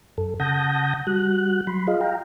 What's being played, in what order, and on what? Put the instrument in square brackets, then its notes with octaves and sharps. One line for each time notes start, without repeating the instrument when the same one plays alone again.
[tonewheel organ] F#2 A4
C#3 F#5 A5 D#6 G6 A#6
G3 F#4 F#6
F#3 B5 C6
F4 G#4 D#5 F5
F5 G5 A#5